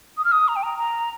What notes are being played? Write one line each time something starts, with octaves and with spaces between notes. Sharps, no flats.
D#6
F6
D#6
A#5
G5
A#5
A#5